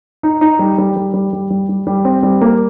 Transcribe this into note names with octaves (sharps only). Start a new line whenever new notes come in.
D#4
D#4
G3
G3
G3
G3
G3
G3
G3
G3
C4
G3
A#3